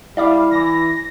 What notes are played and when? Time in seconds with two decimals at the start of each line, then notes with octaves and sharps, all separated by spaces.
0.17 G3 E4 D5 E5 F5 D6
0.51 E3 A#6